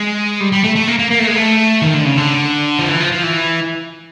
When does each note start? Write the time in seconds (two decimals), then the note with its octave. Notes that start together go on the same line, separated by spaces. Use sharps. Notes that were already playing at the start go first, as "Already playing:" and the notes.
Already playing: G#3
0.40 G3
0.52 G3
0.64 A3
0.76 A3
0.88 A#3
0.99 A#3
1.11 A#3
1.19 A3
1.28 G#3
1.36 A3
1.82 D#3
1.94 D3
2.05 C#3
2.17 D3
2.79 F3
2.89 E3
3.01 F3
3.12 F3
3.24 E3